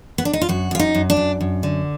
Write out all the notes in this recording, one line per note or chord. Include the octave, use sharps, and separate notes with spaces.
B3
D4
D#4
F4
F#2 F#4
F#2 F4
D#4
F#2
D4
F#2
F#2
D3